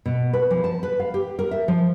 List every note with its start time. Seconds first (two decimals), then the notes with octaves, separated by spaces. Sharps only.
0.06 B2
0.33 B4
0.51 F3
0.64 A5
0.83 B4
1.00 F5
1.14 G4
1.39 A#4
1.51 E5
1.68 F3